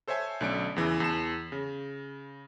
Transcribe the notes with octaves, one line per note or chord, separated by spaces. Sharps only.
A4 C5 C#5 E5 G#5
B1 D3 A3 C#4 D5 D7
E2 C#3 E3
E2 A5 E7
C#3